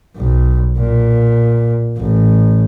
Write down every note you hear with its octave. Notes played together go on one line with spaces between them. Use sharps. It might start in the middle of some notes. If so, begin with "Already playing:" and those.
B1
A#2
A1